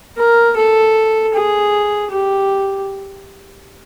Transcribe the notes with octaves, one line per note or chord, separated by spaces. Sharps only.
A#4
A4
G#4
G4